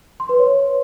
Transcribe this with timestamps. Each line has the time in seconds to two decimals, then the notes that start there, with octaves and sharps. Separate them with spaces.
0.20 C6
0.29 B4
0.39 C#5